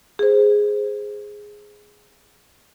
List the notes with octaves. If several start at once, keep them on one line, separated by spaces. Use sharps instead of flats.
G#4 C5